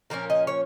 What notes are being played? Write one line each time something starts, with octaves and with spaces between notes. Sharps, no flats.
A#2 F3 A#3 C#4 A#4
D#5
C#5